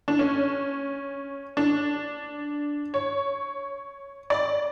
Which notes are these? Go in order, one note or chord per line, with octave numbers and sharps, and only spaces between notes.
D4
C#4
D4
C#5
D5